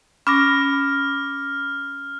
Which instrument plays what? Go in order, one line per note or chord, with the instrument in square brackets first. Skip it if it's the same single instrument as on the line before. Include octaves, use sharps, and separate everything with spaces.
[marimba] C#4 [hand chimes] B5 D6 A#6 [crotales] F6